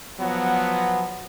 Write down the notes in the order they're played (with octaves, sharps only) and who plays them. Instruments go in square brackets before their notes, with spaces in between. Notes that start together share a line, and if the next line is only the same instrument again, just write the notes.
[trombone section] F3 F#3 B3